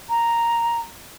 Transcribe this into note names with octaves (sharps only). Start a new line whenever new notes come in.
A#5